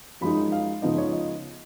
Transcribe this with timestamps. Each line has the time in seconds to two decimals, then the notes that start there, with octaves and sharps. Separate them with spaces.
0.21 F#2 F3 G#3 D#4 B5
0.52 F5
0.82 C#2 C#3 F3 B3 D#4 D#5
0.98 C#5
1.13 D#5